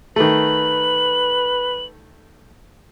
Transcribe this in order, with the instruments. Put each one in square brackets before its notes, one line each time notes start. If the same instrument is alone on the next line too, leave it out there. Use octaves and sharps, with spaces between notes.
[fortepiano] D#3 A3 [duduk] B4 [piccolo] F#7